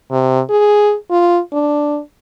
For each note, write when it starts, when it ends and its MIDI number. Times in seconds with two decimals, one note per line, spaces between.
0.11 0.41 48
0.50 0.95 68
1.11 1.40 65
1.53 1.99 62